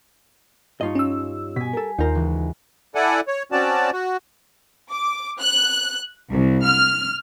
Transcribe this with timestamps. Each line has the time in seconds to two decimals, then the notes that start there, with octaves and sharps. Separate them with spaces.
0.81 G2 D#4 F4 C#5 D#5
0.95 C#4 E6
1.56 B2 G#5 B6
1.73 A4 A#4
1.98 D#2 D#4 F4 A#4 C5 A#5
2.15 C#2 E3
2.95 E4 A4 D5 F#5 G#5
3.28 C#5
3.52 C4 C#4 F#4 D5 A5
3.93 F#4
4.90 D6
5.39 F#6
6.31 C2
6.64 F6